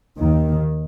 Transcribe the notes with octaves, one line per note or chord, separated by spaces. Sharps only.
D#2 D#3